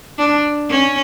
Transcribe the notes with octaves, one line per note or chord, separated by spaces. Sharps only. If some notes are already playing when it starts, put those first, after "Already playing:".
D4
C#4